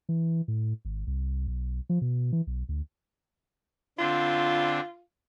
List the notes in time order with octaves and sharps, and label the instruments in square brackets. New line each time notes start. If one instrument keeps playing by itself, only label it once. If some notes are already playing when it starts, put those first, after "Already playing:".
[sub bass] E3
A2
G#1
C2
B1
F3
B2
E3
B1
D2
[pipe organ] D3 C4 D4 [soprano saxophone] F4